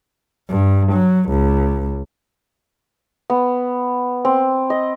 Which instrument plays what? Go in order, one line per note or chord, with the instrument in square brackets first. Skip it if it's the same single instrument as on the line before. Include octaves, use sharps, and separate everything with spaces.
[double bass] G2
F#3
C#2
[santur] B3
C4
D#5